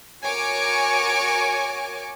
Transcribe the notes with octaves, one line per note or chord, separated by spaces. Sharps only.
F#4 A#4 C#5 G#5 C#6 D6